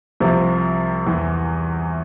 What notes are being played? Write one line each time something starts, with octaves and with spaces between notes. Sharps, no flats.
C2 C3 F3
E2 E3